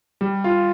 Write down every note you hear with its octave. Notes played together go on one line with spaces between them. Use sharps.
G3
F4